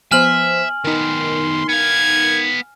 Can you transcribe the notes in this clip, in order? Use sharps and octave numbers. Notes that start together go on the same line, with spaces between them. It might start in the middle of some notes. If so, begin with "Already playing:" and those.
F3 B3 C5 E5 G#5 F6 F#7
D#3 B3 D#4 A#4 C6
B3 F5 G#6